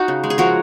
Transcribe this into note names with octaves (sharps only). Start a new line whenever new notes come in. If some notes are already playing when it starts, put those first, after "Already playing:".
Already playing: D#4 F#4
C#3
G#3
G#4
F3 F#4 A#4